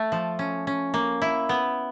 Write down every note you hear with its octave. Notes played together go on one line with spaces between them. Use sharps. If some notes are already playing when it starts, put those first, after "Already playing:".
Already playing: A3
F3
C#4
C#4
A#3
E4
B3